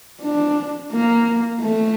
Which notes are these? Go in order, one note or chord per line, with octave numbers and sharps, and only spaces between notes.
D4
A#3
A3